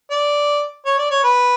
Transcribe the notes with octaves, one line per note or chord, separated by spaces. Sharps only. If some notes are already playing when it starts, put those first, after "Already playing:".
D5
C#5
D5
C#5
B4